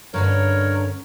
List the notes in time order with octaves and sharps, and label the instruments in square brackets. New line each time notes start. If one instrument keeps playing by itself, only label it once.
[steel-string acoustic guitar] G2 D3 C#4 [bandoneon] A#4 C#5